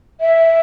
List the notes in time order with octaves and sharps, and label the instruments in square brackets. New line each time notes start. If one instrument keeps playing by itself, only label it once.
[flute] E5